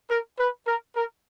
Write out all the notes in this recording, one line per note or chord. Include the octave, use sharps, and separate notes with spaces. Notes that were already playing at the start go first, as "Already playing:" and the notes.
A#4
B4
A#4
A#4